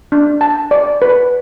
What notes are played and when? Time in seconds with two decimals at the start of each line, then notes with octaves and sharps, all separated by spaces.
0.12 D4
0.41 A5
0.71 D5
1.02 B4